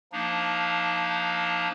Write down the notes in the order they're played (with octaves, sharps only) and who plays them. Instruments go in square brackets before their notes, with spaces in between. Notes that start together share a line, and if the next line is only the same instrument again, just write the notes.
[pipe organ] F3 A#3 D4 D#4